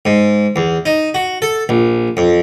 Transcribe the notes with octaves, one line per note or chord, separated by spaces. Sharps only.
G#2
E2
D#4
F#4
A4
A#1
F2